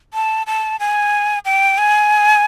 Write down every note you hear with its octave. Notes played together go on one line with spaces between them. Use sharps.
A5
A5
G#5
G5
G#5